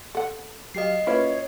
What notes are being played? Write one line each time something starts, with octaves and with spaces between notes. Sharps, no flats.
A4 F#5
F#3 G4 D#5 F5 C7
A#3 C#4 E4 F4 B4 C#5